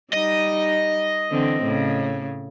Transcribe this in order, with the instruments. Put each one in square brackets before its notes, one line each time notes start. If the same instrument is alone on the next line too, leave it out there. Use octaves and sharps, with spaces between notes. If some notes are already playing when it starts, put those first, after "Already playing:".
[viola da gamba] G3 D#4 [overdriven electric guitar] D#5
[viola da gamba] D3 E3 C4
A2 C#3